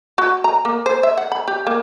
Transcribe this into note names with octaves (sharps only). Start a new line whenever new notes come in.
F#4
A#5
A#3
C5
E5
F#5
B5
G4
A#3